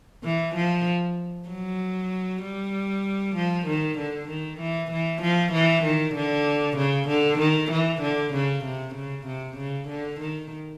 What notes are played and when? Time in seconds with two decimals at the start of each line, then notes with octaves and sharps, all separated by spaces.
0.24 E3
0.56 F3
1.49 F#3
2.43 G3
3.36 F3
3.66 D#3
3.98 D3
4.29 D#3
4.60 E3
4.92 E3
5.22 F3
5.53 E3
5.84 D#3
6.15 D3
6.77 C#3
7.09 D3
7.40 D#3
7.72 E3
8.02 D3
8.34 C#3
8.65 C3
8.95 C#3
9.27 C3
9.57 C#3
9.89 D3
10.20 D#3